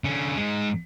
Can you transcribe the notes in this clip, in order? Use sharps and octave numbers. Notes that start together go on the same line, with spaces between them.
D3 C#4
G#2 G#3